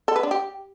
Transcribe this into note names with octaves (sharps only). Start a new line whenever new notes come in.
A4
B4
D4
G4